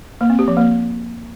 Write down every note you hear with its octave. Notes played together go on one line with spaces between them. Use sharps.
A#3
C4
G4
F3
A#3